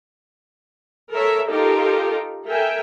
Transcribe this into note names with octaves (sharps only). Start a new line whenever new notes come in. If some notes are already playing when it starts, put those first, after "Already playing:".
A4 A#4 C#5 E5
D#4 F4 G4 A4 A#4
A4 A#4 E5 G5 G#5